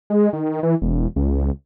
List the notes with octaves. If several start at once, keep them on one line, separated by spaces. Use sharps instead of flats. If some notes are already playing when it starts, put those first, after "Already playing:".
G#3
D#3
E3
E1
C#2